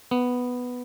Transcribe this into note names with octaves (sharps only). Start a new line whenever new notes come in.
B3